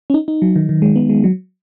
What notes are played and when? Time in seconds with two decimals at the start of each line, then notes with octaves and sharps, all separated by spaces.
0.10 C#4
0.14 D#4
0.28 D#4
0.42 F#3
0.56 D#3
0.69 D#3
0.82 G#3
0.96 B3
1.09 G#3
1.24 F#3